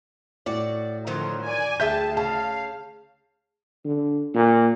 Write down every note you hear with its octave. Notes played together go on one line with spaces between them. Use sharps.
A2 F#4 D5
D3 D#3 F3 F#3 C5
D5 G#5
D2 G#4 E5 G5 A5 G6
C#3 F5 A5
D3
A#2